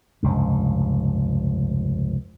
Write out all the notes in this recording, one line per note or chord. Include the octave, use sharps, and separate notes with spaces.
F1 C#2 G2